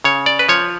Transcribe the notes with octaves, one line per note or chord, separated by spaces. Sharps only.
C#3 C#5
D5
B4
F3 C#5